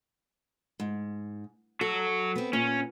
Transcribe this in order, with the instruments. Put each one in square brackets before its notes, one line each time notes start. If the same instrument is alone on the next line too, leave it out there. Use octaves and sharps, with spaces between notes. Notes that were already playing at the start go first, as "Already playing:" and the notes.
[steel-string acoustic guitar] G#2
[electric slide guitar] F#3 F#4 [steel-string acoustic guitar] A4
[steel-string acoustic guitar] B3 C4
[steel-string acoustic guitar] A#2 [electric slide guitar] C#4